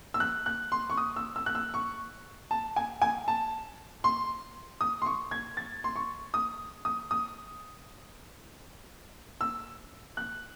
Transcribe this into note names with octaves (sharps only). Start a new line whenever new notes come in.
E6
F#6
F#6
C6
C#6
D#6
E6
E6
F#6
E6
C#6
A5
G#5
G#5
A5
C6
D#6
C6
C#6
G#6
A6
C6
C#6
D#6
D#6
D#6
E6
F#6